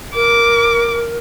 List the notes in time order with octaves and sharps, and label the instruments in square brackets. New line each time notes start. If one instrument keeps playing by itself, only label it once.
[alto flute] A#4 [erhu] D6